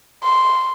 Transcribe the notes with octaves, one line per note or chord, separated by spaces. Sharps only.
C6